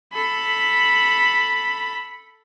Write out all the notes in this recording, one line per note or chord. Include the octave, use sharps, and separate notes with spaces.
A4 B5